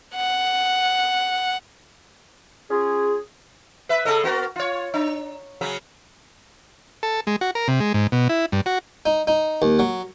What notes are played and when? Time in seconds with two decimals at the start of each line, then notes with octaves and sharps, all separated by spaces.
0.15 F#5
2.70 C#4 F4 G#4
3.89 B4 E5
4.05 C#3 A4 D#5
4.24 B3 F#4 A#4
4.56 F4 C#5
4.94 D4
5.61 C#3 F#3 C#4
7.03 A4
7.27 G#3
7.41 F#4
7.55 A#4
7.68 C3
7.80 G#3
7.94 G#2
8.12 B2
8.29 E4
8.52 G2
8.66 F#4
9.06 D#4
9.27 D#4
9.62 D#2
9.79 F#3